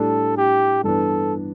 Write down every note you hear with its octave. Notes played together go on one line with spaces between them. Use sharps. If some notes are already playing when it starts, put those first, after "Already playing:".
Already playing: A2 G3 D4 A4
G4
G2 E3 B3 D4 A4